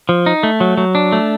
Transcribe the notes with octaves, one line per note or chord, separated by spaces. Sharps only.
F3
D#4
A3
F#3
F#3
D4
A3